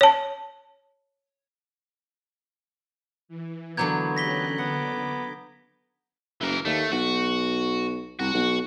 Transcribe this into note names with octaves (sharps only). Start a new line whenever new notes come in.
C#5 A5
E3
D3 F#3 A#3 B3 A#5 G6 G#6
C#4 G4 F#6 A#6 B6 G7
D3 B3 F#5 D6
F#1 E3 A#4
D#2 A3
B1 F#4
C2 F#4
B1